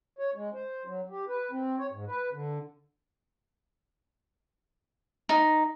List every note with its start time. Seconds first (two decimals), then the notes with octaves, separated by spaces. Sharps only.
0.19 C#5
0.35 G#3
0.54 C5
0.85 F#3
1.10 G4
1.28 B4
1.51 C4
1.79 C#5
1.91 G#2
2.07 B4
2.32 D3
5.29 D#4